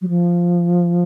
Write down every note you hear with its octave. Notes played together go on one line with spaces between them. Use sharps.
F#3
F3